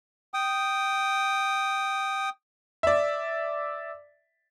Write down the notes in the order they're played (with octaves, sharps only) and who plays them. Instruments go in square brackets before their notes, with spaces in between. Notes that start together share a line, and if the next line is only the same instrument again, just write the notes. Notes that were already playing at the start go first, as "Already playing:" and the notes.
[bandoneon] G5 D#6
[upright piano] D5 E5